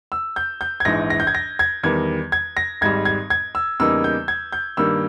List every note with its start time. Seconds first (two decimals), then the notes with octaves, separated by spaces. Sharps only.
0.12 E6
0.36 G6
0.61 G6
0.80 G#6
0.85 A#1 G#2 E3 A#6
1.10 A#6
1.20 G6
1.27 G#6
1.35 A#6
1.59 G#6
1.83 E2 D#3 G3 G#6
2.32 G#6
2.57 A#6
2.81 G#1 G#2 G3 G#6
3.05 G#6
3.30 G#6
3.55 E6
3.79 E2 C#3 G3 A#3 D#4 E6
4.04 G6
4.28 G#6
4.53 G6
4.77 G2 D#3 G3 A#3 E6